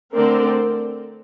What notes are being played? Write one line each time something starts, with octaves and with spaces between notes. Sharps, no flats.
D3 A3 C4 A#4 D5